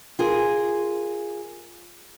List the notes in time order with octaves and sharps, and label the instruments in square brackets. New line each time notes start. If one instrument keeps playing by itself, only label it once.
[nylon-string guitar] F4 G#4 A#4